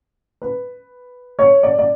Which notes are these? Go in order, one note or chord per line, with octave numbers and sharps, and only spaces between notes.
B4
C#5
D5
D5